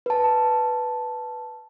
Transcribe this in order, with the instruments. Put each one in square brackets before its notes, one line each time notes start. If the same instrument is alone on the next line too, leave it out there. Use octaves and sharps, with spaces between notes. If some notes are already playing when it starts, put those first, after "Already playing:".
[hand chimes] B4 A5